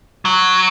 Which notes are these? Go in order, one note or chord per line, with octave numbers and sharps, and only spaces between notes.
F#3